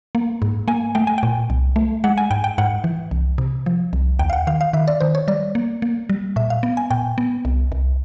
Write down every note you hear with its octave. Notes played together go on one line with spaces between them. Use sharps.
A#3
G#2
A#3 G#5
A3 G5
G#5
A#2 G5
C2
A3
G#3 F#5
G#5
G#2 G5
G5
G#2 F#5
E3
C2
C3
F3
C2
D#2 G5
F5
F#5
D#3 F5
F5
D#3 E5
D5
D#3 C5
C#5
G3 D5
A#3
A#3
G3
A#2 E5
F5
B3
G#5
A#2 G5
B3
C2
C2